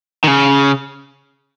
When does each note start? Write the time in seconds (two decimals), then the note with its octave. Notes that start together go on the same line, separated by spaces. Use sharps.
0.24 D#3
0.27 C#3